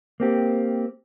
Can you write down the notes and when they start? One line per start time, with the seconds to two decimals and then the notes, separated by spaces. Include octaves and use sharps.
0.20 A#3 C4 G4